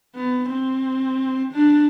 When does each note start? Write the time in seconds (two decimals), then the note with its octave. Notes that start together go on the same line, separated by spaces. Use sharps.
0.15 B3
0.49 C4
1.53 D4